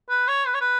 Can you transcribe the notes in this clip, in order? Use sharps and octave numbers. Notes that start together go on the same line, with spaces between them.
B4
C#5
B4
C#5
B4